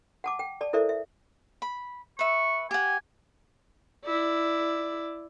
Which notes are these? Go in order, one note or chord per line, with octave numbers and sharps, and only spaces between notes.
F#5 A5 D6
G5
D5 A5
E4 A4 A#4 C5 D5 E5
E5
B5
B4 E5 C#6
G4 F#5 G#5
E4 D5